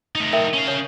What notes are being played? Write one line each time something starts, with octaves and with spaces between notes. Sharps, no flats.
A3 D#4
A#4 E5 G5
C#4 F5
C#5